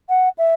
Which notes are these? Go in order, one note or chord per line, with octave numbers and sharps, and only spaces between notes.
F#5
E5